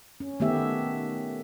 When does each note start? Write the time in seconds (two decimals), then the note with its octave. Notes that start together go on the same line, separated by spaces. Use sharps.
0.20 C#4
0.40 D#3 A3 B3 G4 E5